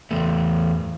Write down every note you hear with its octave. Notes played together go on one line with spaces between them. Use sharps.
E2 A3